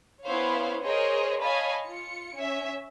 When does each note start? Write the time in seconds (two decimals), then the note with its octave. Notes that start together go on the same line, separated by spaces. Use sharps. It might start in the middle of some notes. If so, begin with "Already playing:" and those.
0.25 B3 C#4 E4 C5 C#5 F5
0.84 G#4 A#4 C5 C#5 D#5
1.41 C#5 D#5 F5 G#5 A5 B5
1.86 F4 C#7
2.36 C#4 E5